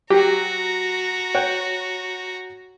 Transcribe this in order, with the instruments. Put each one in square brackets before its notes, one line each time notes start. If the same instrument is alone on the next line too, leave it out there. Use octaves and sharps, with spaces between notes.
[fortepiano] F#3 [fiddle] F#4 A#5 [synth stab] G4
[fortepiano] C#5 F#5 G5